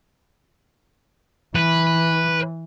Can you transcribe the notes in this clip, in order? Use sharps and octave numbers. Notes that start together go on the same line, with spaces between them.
E3 B4